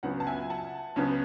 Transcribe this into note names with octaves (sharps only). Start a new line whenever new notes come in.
C#2 C#3 F#3 B3 F#5
A5
E5 G#5
F#5 A5
C#2 C#3 F#3 B3